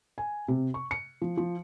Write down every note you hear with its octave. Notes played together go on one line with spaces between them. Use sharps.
G#5
C3
C#6
C#7
F3
F3